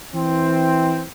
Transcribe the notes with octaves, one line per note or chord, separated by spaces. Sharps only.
E3 C4